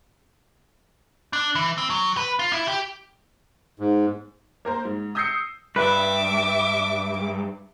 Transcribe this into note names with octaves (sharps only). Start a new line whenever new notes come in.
D4
E3
C4
F#3
B4
F4
E4
G4
G#2
A#3 A#4 C5
G#2
D#6 E6 G6 A#6 C7 C#7
G2 B4 E5 D6